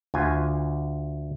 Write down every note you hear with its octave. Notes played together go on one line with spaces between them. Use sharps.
D2 F4 G#5